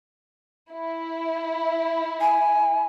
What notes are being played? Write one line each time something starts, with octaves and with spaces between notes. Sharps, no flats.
E4
G#5